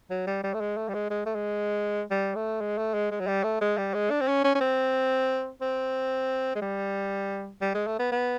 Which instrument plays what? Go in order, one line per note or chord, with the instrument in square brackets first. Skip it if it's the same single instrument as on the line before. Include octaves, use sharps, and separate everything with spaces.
[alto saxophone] F#3
G3
G3
A3
G#3
A3
G3
G#3
G#3
A3
G#3
G3
A3
G#3
A3
G#3
G#3
F#3
G3
A3
G#3
G3
G#3
D4
C4
C#4
C#4
C#4
C4
C4
G#3
G3
G3
G#3
A3
B3
B3